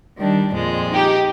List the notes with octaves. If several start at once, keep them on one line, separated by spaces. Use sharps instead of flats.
D#3 G3 D4
F2 A#2 G#3
D#4 G4